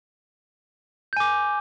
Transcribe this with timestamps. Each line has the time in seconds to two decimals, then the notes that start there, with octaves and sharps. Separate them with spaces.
1.13 G6
1.17 G#5
1.20 D6